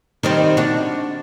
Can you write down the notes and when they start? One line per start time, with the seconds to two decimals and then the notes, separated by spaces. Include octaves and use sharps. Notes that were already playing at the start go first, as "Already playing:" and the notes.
0.23 D#3 G3 C4
0.57 D4 F#4